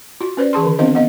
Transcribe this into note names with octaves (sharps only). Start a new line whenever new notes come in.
F4 F#4
C#4 B4 C5 D5
E3 G#4 A5 C6
D3 D#3
B3 C4 D4 F4 C5 D#5
B3 D#5 F#5